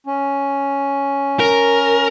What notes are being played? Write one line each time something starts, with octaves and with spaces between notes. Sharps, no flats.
C#4
A#4